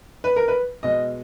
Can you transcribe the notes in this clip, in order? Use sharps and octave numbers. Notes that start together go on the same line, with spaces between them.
B4
A#4
B4
B2 G#3 D#5